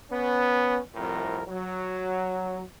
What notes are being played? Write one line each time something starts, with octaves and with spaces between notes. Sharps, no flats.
B3 C#4
C2 F2 A2 A#4
F#3